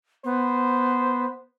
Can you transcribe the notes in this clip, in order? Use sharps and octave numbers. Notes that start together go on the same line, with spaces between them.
B3 C5